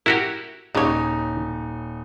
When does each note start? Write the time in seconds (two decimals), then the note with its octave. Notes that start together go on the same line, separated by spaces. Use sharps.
0.06 E4 F#4 G4 A#4
0.75 D#1 C#3 D#4 C#5